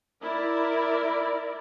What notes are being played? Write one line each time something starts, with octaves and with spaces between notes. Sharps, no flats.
E4 A#4 D5